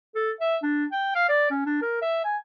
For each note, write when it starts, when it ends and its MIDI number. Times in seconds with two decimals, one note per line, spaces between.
0.15 0.31 69
0.41 0.56 76
0.63 0.85 62
0.92 1.11 79
1.15 1.25 77
1.29 1.50 74
1.51 1.66 61
1.66 1.81 62
1.82 2.01 70
2.02 2.22 76
2.24 2.36 80